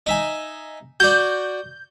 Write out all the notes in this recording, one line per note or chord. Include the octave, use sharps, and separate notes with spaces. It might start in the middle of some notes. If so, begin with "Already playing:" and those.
D#4 E5 G#5
F#4 D5 G6